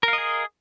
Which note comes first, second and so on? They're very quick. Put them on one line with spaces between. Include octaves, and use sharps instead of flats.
A#4 F5 D#5 G#4